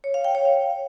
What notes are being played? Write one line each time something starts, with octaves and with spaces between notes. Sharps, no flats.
C#5
F5
G5
C#5
F5